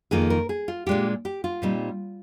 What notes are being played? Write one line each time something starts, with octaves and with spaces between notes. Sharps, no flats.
F2 D#3 A#3 F4 G#4
A#4
G#4
F4
A#2 G#3 D4 F4 G4
G4
F4
A#2 G3 C4 D#4